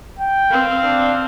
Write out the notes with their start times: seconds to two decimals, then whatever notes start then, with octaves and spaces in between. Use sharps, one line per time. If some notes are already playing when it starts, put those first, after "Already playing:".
0.19 G5
0.51 C4 F5
0.83 D4